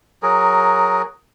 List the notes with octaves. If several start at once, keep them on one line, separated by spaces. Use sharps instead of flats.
F#3 G#4 A#4